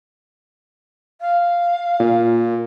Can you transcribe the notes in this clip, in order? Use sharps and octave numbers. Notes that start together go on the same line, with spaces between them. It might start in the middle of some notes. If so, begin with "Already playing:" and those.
F5
A#2